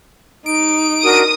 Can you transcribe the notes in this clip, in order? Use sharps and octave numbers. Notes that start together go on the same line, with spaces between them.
D#4 D7
D4 F#4 A#4 D#6